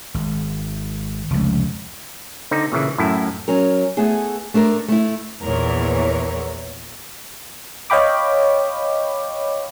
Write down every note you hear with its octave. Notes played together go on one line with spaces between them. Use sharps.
G#1
F1 C#2
D3 C4 D#4
A#2 C#3 E3
F#2 A2 E4
F#3 C#4 A#4
A3 B3 E4 G#4
A3 D4 A4 A#4
A3 E4
A#1 E2 A#2 E3 A#4 C#5
C#5 D#5 F5 G5 B5 D6